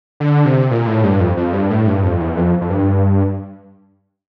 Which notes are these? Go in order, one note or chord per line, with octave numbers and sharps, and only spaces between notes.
D3
C3
A#2
A2
G2
F2
F2
G2
A2
G2
F2
E2
F2
F2
G2